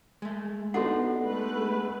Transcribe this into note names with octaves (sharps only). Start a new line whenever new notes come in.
G#3 A3
B3 D4 D#4 F#4 G4 A4 F#5
G#3 A3 B4